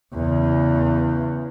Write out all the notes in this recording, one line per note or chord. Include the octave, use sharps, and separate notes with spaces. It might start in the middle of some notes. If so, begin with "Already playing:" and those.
E2 C#3